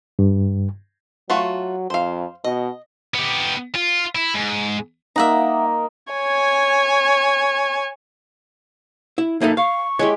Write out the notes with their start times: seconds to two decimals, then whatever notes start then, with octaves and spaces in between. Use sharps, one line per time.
0.19 G2
1.30 F#3 A3 F4 F#4
1.90 F2 C5 F5
2.44 B2 D#5
3.15 B3 G4
3.75 F4
4.15 E4
4.34 G#2
5.16 A#3 D#4 E5 F#5 A#5
6.13 C#5 G#5
9.18 E4
9.41 A#3 D#4 A4 E5
9.57 F5 C#6
9.99 G#3 E4 G4 C#5